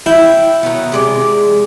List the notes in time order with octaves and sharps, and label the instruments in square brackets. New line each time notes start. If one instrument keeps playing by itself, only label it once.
[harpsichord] E4 [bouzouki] G5
[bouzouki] D#3 F#3 B3
C3 G#3 D5